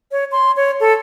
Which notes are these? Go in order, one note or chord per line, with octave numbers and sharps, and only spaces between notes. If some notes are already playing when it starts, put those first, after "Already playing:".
C#5
C6
C#5
A4